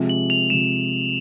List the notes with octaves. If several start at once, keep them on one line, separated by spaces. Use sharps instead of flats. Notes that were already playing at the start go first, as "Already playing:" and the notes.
Already playing: C3 F3 G#3
F#7
F7
C3 F3 G#3 E7